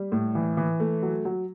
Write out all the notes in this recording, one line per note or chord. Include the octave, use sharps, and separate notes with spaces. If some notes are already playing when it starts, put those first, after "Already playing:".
Already playing: G3
A2
E3
E3
A3
F#3
F#3